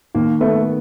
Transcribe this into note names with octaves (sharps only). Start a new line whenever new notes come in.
D#2 A#3
A3 B3